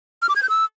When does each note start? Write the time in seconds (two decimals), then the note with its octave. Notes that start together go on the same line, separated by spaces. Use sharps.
0.22 F6
0.29 D6
0.36 G#6
0.43 G6
0.49 E6